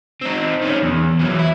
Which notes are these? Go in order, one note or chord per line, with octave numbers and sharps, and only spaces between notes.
C4 D#4
D#3 C#4
E2
E3 F#3
E4